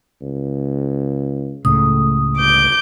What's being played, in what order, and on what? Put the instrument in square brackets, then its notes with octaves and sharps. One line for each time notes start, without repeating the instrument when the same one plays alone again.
[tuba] C#2
[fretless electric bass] C#2 A2 C#3 [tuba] A3 [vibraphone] D#6
[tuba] G1 [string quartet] D6 G6